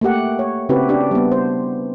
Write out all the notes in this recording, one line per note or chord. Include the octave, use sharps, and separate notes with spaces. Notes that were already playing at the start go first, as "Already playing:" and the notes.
A3 A#3 G4 F#5
C#5
C#3 C4 E4 F#4 G4 B4
D4 G4
G3 B3
C5